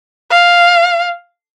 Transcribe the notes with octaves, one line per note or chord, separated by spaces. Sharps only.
F5